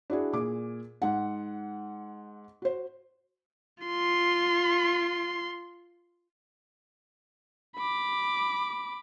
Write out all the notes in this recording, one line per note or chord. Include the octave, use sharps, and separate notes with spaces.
D4 E4 F#4 G#4
A#2 G#4 D6
G#2 F#5
F#4 C5
F4 C6
B5 D6